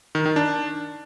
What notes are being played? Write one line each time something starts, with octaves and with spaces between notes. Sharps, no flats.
D#3
D#3
D4